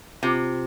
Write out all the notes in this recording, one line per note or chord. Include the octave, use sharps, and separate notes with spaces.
C3 F4